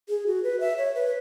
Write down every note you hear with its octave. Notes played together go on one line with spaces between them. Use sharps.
G#4
F#4
B4
E5
C#5
B4